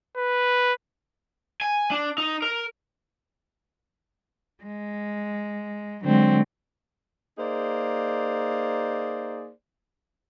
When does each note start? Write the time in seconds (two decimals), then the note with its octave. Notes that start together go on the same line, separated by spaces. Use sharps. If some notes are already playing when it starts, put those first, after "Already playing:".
0.17 B4
1.61 G#5
1.91 D4
2.18 D#4
2.42 A#4
4.64 G#3
6.04 D3 F#3 G#3 C4
7.38 A#3 D#4 G#4 C5 D5